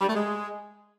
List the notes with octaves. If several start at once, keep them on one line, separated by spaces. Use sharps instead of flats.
G3
A3
G#3